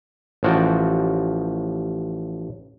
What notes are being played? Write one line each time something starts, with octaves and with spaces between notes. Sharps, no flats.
A1 F3 F#4 G5 A5